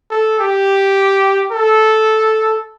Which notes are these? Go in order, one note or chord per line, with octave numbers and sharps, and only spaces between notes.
A4
G4
A4